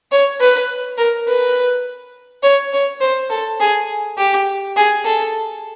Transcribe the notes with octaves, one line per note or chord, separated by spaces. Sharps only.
C#5
B4
A#4
B4
C#5
C#5
C5
A4
G#4
G4
G#4
A4